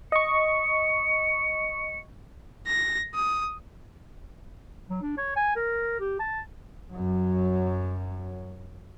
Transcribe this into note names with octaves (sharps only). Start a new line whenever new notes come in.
D#5 C#6 C#7
A#6
D#6
F#3
D4
C#5
G#5
A#4
G4
A5
F#2 F#3